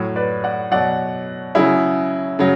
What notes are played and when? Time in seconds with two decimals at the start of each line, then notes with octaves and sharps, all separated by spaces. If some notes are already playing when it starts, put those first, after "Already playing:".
Already playing: A2 F#3
0.16 B4 D5
0.44 D5 F#5
0.71 B2 F#3 D5 F#5
1.55 C#3 F#3 E4 G#4
2.39 C#3 F#3